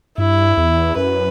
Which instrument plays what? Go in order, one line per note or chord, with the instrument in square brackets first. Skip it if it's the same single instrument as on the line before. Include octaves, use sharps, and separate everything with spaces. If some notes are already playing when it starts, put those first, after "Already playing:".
[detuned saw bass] G2 [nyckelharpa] E4
[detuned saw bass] E2
[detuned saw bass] F#2 [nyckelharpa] B4